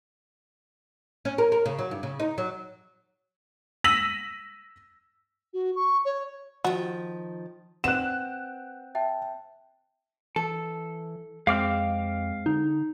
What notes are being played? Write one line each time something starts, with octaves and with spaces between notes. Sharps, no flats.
C#4
A#4
A#4
C#3
F#3
G2
C#3
D#4
F#3
E6 A#6 B6 D#7 F#7
F#4
C#6
C#5
D#3 F3 F#4
C4 B4 F#5 F#6 E7
E5 G5 A5
E3 A4
F2 G#3 C4 F5 D6 F6
D3 D#4